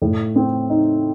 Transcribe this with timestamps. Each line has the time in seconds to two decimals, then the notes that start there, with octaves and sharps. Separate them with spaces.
0.02 A2
0.36 C4
0.70 D#4